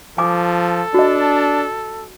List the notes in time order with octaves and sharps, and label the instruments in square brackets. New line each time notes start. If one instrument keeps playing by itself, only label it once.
[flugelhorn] F3 [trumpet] A4 [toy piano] G#5 D6 D#6
[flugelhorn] D4 [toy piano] F#4 D#5